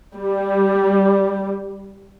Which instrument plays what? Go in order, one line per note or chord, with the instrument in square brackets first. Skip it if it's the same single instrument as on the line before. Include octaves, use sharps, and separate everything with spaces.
[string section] G3